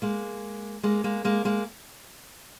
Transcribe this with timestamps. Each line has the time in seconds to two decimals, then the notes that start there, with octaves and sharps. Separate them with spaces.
0.02 G#3 A#3
0.83 G#3 A#3
1.04 G#3 A#3
1.24 G#3 A#3
1.45 G#3 A#3